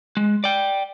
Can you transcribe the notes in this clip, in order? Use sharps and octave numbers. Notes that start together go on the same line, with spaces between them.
G#3
D5 G5